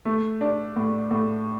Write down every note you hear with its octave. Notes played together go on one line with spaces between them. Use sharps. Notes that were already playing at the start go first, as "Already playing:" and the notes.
A3
D4
A2
A2